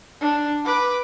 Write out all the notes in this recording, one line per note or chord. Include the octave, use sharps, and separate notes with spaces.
D4
B4 D6